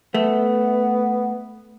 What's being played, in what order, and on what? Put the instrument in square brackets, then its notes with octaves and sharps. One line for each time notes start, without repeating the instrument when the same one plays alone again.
[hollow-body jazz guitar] A3 [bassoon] B3